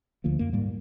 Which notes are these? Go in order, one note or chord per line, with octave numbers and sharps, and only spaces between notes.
D2 D3 F3 A#3
F#2 A#3
G#2 G3 A#3